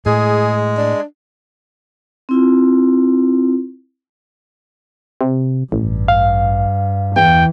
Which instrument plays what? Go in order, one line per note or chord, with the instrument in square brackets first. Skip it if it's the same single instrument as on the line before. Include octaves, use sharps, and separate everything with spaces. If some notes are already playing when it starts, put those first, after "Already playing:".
[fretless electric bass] A2 [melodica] G#3 [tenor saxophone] G#4
[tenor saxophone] D4
[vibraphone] C4 E4 F4
[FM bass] C3
[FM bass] A1 [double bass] G2
[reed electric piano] F5
[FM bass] E2 [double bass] E3 [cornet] G5